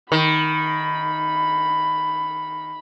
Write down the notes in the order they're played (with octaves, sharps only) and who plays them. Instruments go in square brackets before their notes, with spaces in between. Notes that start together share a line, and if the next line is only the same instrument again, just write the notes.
[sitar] D#3 [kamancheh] B5